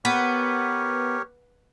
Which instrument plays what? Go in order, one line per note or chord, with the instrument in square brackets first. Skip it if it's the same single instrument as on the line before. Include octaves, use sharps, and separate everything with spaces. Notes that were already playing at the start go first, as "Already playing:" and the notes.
[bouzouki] B3 [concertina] G4 A#4 C#5